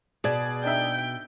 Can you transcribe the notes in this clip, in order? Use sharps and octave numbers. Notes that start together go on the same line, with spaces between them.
B2 G#4 D5 G#6
D4 D#4 E5 G5